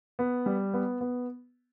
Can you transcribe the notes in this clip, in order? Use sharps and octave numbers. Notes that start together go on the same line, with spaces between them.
B3
G3
B3
B3